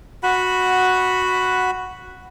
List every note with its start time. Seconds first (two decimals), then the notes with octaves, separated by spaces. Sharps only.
0.23 F#4 F#5 B5